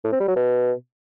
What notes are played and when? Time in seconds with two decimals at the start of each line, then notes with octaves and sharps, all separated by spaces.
0.04 A2
0.12 C4
0.20 G3
0.28 F#3
0.36 B2